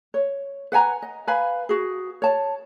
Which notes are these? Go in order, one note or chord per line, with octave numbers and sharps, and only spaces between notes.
C#5
B4 F#5 G#5 A#5
D#5
B4 F5 G#5 B5
F#4 G#4
C#5 A5